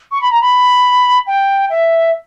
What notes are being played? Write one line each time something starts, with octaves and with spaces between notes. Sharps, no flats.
C#6
B5
A#5
B5
G5
E5